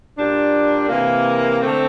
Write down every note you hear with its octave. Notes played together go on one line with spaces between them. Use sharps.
A#2 G3 D4
C3 E3 A#3
D3 A3 C4